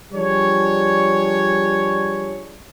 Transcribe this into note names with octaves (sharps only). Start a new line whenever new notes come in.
F3 G3 D4 G#4 C#5